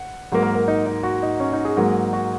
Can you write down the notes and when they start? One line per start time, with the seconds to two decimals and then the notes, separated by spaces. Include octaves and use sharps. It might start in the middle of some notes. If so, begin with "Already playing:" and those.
Already playing: F#5
0.32 G#2 F#3 A#3
0.43 A#4
0.55 A#4
0.68 D#4
0.86 D#4
1.03 F#4
1.23 D#4
1.40 C#4
1.53 D#4
1.65 G#4
1.76 G#2 F#3 A#3
2.13 F#4